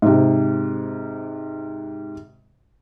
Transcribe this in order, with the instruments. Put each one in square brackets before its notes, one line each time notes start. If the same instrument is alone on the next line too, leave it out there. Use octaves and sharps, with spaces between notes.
[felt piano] G#2 C3